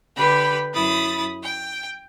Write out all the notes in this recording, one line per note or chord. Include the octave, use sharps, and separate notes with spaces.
D3 G4 B4 B5
F#2 E4 B5 D#6 A6
G5